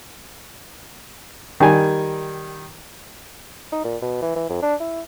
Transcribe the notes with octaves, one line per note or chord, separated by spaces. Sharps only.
D#3 G3 G#5
D#4
A#2
B2
E3
E3
F2
D4
E4